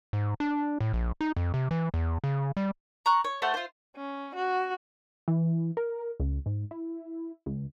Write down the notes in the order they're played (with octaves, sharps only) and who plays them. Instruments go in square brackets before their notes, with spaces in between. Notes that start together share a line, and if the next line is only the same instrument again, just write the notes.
[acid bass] G#2
D4
A2
A#1
D#4
F2
C3
E3
E2
C#3
G3
[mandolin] A#5 C#6 F#6
C#5
A3 F#4 C5
F4 C5
[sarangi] C#4
F#4
[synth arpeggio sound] E3
A#4
C#2
G#2
E4
C#2